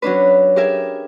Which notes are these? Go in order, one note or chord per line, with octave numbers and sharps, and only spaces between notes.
F#3 C#4 D4 B4
G4 G#4 A#4 E5 G#5